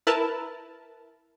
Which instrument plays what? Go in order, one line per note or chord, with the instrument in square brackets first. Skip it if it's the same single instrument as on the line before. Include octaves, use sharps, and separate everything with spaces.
[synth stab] E4 A#4 B4 A5